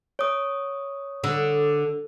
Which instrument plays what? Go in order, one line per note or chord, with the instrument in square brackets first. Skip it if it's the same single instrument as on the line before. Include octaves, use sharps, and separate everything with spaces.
[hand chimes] C#5 D#6
[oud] D3